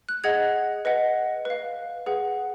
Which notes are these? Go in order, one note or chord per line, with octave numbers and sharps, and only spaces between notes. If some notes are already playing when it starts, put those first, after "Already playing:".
F#6
G#4 D#5 F#5 G#6
B4 D#5 F#5
B4 F5
G#4 B4 F#5